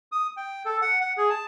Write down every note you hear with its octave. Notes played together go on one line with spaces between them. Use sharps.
D#6
G5
A4
F#5
F#5
G#4
A5